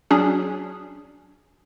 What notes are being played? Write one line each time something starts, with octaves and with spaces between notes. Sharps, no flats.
F#3 C#4 D4 G#4